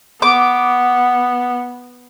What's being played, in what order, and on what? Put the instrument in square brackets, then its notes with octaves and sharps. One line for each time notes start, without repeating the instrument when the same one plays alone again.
[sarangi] B3 [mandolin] D6